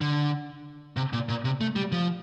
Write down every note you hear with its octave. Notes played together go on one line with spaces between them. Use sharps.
D3
C3
A#2
A#2
C3
A3
G3
F3